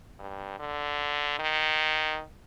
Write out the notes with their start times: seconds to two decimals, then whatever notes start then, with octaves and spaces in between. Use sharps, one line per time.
0.19 G2
0.59 D3
1.39 D#3